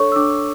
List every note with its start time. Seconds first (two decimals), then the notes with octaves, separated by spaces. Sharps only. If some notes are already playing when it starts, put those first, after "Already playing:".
Already playing: D4 A4 C#5 C#6
0.12 E6
0.16 D4 D6